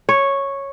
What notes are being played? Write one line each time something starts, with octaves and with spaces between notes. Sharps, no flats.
C#5